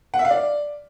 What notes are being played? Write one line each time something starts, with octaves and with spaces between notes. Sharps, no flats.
F#5
E5
F5
D5